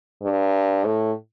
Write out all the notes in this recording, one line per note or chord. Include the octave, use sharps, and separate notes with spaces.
G2
A2